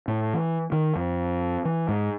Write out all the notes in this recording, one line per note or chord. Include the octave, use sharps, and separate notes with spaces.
A2
E3
D#3
F2
E3
G#2